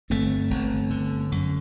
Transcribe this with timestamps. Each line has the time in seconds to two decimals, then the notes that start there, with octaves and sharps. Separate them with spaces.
0.10 G1 A3 C4
0.50 G1
0.90 D3
1.32 F#2